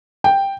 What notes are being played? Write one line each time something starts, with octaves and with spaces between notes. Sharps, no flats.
G5